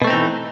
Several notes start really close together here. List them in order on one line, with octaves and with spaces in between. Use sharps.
B2 A3 C4 D#4 E3